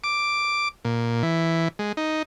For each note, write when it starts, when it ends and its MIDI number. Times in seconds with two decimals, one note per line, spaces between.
0.04 0.68 86
0.85 1.23 46
1.23 1.68 52
1.79 1.92 56
1.97 2.23 63